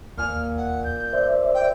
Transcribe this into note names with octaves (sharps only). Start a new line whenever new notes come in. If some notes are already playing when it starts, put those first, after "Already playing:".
D#2 A#2 G#5 F6
F#5
G6
C5 D5 E5
G5